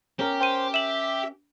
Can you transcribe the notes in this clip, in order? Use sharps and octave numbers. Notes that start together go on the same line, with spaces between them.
C#4 G4 A#4
C5 G5 D#7
E5 E7 F#7